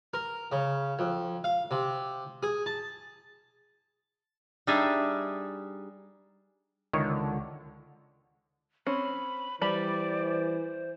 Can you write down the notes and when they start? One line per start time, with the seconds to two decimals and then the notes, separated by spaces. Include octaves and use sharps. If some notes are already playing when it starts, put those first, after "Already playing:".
0.14 A#4
0.52 C#3
0.99 F2
1.44 F5
1.71 C3
2.43 G#4
2.66 A5
4.67 G3 D4 D#4 G#4 E5
6.93 C#2 D3 D#3 E4 C#5
8.87 C4 C#4 B5
9.62 E3 G3 G4 C5 D5 B5